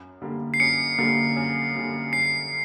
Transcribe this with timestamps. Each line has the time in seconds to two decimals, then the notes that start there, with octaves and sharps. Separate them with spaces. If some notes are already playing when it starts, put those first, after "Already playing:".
Already playing: F#2
0.22 D3 G3 A#3
0.54 C7
0.60 F#2 C#7
0.98 D3 G3 A#3
1.36 F#2
1.75 D3 G3 A#3
2.13 F#2 C7